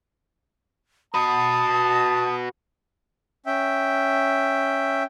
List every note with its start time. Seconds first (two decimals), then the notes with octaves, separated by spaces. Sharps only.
1.14 F#4 B4 A5 D#6
3.46 C#4 E5 G5